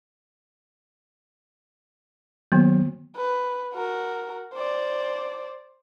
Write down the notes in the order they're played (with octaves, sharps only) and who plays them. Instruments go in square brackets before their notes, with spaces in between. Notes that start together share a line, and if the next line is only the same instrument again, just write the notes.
[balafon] D#3 A#3 B3 [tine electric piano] F#3
[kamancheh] B4
F#4 A#4
C5 D5